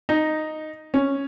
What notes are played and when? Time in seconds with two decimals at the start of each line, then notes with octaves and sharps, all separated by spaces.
0.09 D#4
0.94 C#4